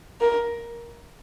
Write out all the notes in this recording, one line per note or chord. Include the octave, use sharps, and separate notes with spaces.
A#4